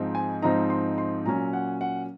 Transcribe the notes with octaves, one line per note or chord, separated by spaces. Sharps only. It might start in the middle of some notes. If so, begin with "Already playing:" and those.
Already playing: G#2 F3 C4 D#4
G#5
G#2 F3 C4 D#4 A#5
C6
C6
A#2 F#3 C#4 A#5
F#5
F#5